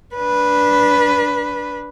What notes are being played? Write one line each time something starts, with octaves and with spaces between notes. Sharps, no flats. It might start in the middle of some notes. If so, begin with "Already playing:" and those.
D4 B4